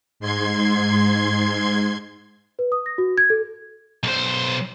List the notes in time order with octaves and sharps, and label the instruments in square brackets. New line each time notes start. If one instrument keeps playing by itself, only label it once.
[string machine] G#2 C6 G#6
[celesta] B4
D#6
A#6
F#4
G#6
A4
[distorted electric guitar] B1 C5